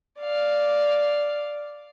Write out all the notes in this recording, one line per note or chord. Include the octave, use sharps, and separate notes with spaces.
D5 F5